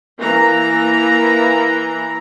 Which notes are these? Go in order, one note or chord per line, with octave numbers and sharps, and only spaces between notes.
E3 A#3 A#5